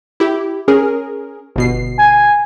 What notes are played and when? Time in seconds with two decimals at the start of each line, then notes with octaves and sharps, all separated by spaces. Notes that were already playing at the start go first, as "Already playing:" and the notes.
0.20 E4 G4
0.68 C#4 G#4 A#4
1.56 G1 B2 C7
1.99 G#5